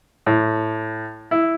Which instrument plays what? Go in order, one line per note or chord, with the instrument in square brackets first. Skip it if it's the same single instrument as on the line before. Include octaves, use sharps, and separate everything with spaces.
[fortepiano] A2
E4